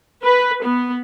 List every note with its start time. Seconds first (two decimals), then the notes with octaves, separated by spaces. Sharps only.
0.24 B4
0.62 B3